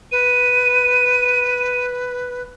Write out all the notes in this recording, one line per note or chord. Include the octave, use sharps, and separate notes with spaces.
B4 D#7